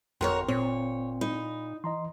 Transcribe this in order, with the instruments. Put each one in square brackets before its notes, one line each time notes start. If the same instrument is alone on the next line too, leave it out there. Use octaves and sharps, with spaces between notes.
[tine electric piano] G1 G5 C6 [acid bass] F2 [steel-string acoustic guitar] F#4 A#4 C#5
[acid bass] A#2 [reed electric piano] C4 [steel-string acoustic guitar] C#5
[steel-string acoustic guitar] D#4 [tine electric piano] B5
[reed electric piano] E3 [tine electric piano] D#5 A#5 C6